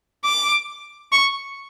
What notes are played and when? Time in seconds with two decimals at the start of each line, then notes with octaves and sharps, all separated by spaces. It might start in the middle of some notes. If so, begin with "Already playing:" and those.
0.25 D6
1.12 C#6